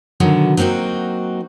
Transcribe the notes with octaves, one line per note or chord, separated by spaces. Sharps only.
B2 D3 D#3 F#3
F#3 A#3 C4 D#4 F#4